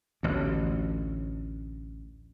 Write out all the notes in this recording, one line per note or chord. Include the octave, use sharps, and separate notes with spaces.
A1 D2